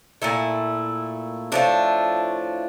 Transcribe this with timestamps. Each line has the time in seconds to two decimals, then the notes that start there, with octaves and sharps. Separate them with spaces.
0.22 A#2 A3 E4
1.52 A2 F3 A3 D4